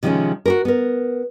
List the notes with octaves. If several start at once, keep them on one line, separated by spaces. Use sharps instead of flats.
C3 D#3 F3 G3 G#3 C#4
F#4 G4 A#4
B3 A#4